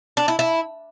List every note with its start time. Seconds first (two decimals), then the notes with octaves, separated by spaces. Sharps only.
0.17 D4
0.28 E4
0.39 E4